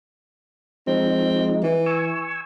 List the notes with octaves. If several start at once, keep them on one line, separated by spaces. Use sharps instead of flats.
F3 G#3 C4 D#4
E3
G#5 C#6 E6